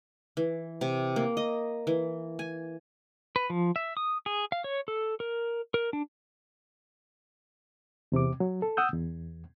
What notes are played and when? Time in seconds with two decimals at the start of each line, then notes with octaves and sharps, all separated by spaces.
0.37 E3
0.81 C3
1.16 A#3
1.37 D#5
1.87 E3
2.39 G#5
3.36 B4
3.50 F3
3.76 E5
3.97 D#6
4.26 G#4
4.52 F5
4.64 C#5
4.88 A4
5.20 A#4
5.74 A#4
5.93 D4
8.12 E2 C3 C4 D6
8.40 F#3
8.62 A4
8.77 F#5 D#6 E6 G6
8.94 E2